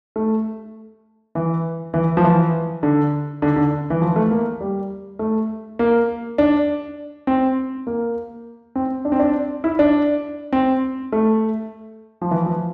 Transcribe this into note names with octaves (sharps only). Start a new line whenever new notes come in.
A3
E3
E3
F3
E3
D3
D3
D3
E3
F3
A3
A#3
G3
A3
A#3
D4
C4
A#3
C4
D4
C4
D4
E4
D4
C4
A3
F3
E3
F3